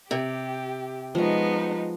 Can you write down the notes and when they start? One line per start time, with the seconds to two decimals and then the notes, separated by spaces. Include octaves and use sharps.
0.11 C3 G4
1.15 F3 G#3 B3 D#4 C#6